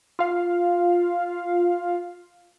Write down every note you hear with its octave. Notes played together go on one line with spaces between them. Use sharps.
F4 F5